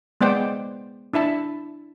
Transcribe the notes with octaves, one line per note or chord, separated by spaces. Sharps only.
G#3 B3 C5 D5 G5
D4 E4 E5 A5